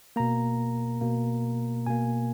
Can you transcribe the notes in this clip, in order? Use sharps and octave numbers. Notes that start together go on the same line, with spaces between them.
B2 A#3 A#5
B2 A#3
B2 A#3 G#5